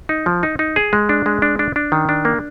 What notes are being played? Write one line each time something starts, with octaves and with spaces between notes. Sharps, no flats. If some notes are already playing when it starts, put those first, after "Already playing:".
D#4
F3
D#4
D#4
G#4
G#3
D4
G#3
D4
D4
D4
D#3
D4
A#3